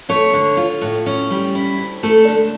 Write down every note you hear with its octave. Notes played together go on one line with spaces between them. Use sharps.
A3 C#5
D3
F4
A2
C#4
G3
E4
D2
A3 A4
D3